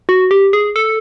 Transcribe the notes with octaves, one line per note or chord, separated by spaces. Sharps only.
F#4
G4
G#4
A4